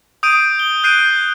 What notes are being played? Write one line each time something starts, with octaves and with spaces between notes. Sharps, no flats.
D#6 G6 D7 D#7
G7
F#6 G6 C7 D7 D#7